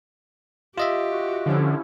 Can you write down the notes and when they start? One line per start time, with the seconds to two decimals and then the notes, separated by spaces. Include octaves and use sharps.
0.78 F4 G4 D#5 E5
1.11 F#4
1.46 D3 F3 C#4 E4